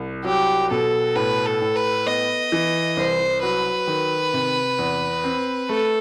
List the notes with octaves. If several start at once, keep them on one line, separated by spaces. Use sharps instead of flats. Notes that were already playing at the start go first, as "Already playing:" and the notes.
Already playing: C2
F#3 G4
B2 A4
A2 B4
A4
A2
B4
B3 D#5
E3
C2 C5
F#3 B4
D#3
C3
E2
C4
A3 A4